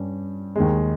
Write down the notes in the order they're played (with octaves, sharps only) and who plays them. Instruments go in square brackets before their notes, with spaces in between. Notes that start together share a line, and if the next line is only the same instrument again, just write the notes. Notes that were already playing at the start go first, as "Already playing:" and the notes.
Already playing: [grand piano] G2 G3 C#4
D#2 D#3 G#3